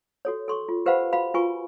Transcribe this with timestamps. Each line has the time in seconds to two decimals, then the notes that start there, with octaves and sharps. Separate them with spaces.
0.25 F#4 A4 C#5
0.48 A4 C6 C#6
0.69 F4
0.86 G4 B4 C5 F5 F#5 B5
1.13 F#4 F5 B5
1.34 F4 F#4 B4 G#5 C#6